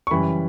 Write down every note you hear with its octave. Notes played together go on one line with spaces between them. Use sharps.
C#6
F#2 C#3 E3 G3 B5